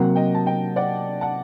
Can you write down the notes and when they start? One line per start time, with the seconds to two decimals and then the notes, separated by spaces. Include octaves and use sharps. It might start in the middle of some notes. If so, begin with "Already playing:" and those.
Already playing: C3 F#3 A#3 F#5
0.16 D#5 G5
0.35 A5
0.46 D#5 G5
0.76 D5 F#5
1.21 F#5 A5